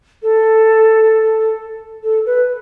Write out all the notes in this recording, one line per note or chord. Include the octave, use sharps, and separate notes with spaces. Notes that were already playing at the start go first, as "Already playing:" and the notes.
A4
A4
B4